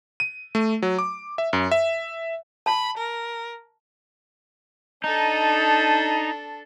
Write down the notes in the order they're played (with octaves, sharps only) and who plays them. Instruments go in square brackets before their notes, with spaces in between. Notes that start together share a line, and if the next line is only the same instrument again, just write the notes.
[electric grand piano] D#7
A3
F#3
D6
E5
F#2
E5
[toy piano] A5 [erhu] B5
[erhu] A#4
[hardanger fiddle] D4 A4 [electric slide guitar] D#4